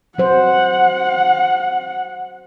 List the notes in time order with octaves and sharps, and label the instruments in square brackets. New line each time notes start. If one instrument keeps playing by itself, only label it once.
[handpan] F#3 C5 [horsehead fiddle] F#5